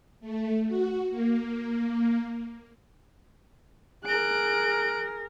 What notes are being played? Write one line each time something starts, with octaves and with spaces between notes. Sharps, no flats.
A3
F#4
A#3
G#4 A#4 F#6 D7